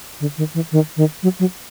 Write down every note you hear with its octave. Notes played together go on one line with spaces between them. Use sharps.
D3
D#3
E3
D#3
D#3
F#3
F#3